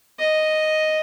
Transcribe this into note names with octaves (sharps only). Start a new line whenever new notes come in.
D#5